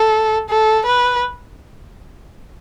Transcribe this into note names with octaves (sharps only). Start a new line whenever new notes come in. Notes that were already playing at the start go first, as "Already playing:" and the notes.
Already playing: A4
A4
B4